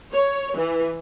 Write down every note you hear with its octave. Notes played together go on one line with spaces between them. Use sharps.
C#5
E3